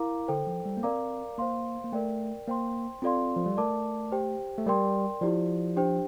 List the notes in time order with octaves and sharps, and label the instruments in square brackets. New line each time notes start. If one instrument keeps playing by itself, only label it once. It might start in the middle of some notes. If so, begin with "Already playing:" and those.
Already playing: [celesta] E4 A#4 F5 A#5 D6
[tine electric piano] D3 [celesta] A4 C5 G5
[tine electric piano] F3
G3
A#3
[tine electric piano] C4 [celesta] A#4 D5 F5 A#5 D6
[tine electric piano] A#3 [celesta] C5 F5 C6
[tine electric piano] A#3
[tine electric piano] A3 [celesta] A#4 D5 G5
[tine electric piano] A#3 [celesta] C5 G5 C6
[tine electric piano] C4 [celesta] F4 A4 D5 F5 C6
[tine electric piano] F3
G3
[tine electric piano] A3 [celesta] A#4 D5 A5 D6
[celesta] G4 C5 G5
[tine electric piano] A3
[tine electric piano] G3 [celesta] A#4 D5 G5 C6
[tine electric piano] F3 [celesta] E4 G4 D5
[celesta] D4 G4 C5 G5